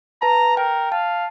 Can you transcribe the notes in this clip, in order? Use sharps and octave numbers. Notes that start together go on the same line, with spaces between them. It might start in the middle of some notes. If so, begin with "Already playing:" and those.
B4 A5 A#5
A#4 G5
F5 A5